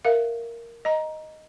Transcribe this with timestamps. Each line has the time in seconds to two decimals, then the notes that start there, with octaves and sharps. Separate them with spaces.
0.05 A#4 E5 F5
0.85 D#5 A#5